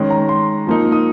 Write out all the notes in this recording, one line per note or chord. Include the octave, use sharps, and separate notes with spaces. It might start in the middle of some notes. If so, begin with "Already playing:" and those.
Already playing: D#3 G#3 C#4
A#5
C6
F3 A#3 D#4
D#6